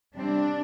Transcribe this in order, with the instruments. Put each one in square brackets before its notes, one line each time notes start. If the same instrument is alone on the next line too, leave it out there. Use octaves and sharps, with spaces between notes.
[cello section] C3 G3 C4 D4